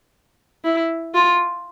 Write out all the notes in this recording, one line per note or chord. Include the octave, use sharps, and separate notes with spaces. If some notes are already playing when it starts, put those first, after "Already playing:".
E4
F4